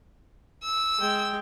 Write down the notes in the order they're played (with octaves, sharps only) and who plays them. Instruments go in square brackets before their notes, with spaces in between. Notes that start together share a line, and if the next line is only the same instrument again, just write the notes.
[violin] E6
[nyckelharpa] G#3 G5